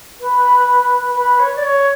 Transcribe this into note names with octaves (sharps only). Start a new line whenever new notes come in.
B4
B4
C#5
D5
C#5